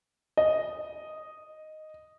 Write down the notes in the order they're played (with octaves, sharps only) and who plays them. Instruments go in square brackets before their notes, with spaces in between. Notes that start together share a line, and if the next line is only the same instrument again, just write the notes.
[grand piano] D#5